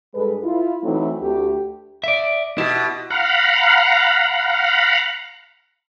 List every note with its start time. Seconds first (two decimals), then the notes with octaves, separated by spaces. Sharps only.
0.15 G2 G3 G#3 A4 B4
0.44 E4 F4
0.83 E3 F#3 A3 C4 D#4 E4
1.22 D2 A3 G4
2.04 D5 E5
2.58 B2 E4 G4
3.10 F5 F#5 A#5 B5